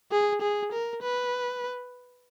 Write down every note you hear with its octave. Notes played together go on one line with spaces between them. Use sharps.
G#4
G#4
A#4
B4